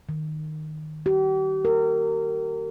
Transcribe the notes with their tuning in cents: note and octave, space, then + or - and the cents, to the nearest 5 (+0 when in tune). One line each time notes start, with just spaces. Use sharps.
D#3 -10
G4 -40
A#4 -25